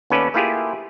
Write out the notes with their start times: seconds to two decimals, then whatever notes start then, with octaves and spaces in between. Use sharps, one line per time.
0.10 D#2 B3 C#4 A4 B4 D5
0.34 A3 A#3 E4 F4 G4 G#4